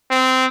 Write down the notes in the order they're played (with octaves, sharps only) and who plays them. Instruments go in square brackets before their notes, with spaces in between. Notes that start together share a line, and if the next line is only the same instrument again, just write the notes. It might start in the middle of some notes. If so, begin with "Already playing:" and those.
[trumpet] C4